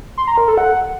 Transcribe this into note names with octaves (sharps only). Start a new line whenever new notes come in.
C6
A#5
A#4
A4
F#5